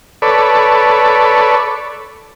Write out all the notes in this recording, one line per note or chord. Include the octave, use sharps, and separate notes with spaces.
A4 B4 C#5 D5